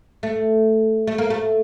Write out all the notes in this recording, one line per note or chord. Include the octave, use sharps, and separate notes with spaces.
A3
A3
A#3
A3